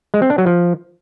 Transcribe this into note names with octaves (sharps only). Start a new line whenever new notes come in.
G#3
C4
D4
F#3
F3